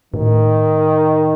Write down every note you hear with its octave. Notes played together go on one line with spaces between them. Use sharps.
A2 D#3